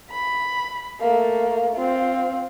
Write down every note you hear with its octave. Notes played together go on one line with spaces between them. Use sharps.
B5
A3 A#3
C4 F4